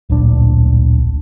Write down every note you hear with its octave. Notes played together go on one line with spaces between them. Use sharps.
D1 A#1 D4